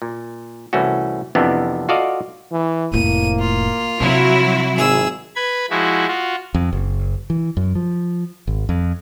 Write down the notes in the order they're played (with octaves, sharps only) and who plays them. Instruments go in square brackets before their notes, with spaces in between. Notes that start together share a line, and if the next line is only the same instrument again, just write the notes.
[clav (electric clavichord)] A#2
C2 E3 A3 C#4 F#4
F2 C3 E3 A#3 B3 D4
F4 F#4 A4 D5 D#5 F5
[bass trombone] E3
[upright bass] F1 A2 [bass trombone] A#3 [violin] D#7
[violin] F4
[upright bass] C3 [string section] F#3 E4
[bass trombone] G#1 [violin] G#4 E6
[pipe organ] B4 B5 G#6
F3 G#3 E4 F#4
F4 F#4
[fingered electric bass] F2
F#1
E3
F#2
F3
G#1
F2